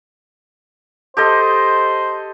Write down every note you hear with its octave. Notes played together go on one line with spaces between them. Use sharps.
G4 A4 C5 D#5